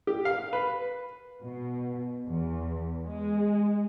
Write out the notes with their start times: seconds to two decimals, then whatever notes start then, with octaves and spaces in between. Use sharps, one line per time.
0.07 G4
0.25 F5
0.53 B4
1.42 B2
2.26 E2
3.07 G#3